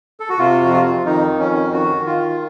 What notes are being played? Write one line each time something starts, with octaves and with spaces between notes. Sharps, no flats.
A4
F#4
C3 F4
F2 F#4
F4
F2
D#3 D#4
F2
C#4
D#3
D#3 F#4
D#3
F4
D#3